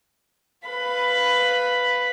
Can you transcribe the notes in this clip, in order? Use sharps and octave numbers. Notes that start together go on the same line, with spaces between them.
B4 F5 B5